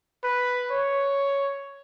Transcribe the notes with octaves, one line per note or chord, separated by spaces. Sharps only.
B4
C#5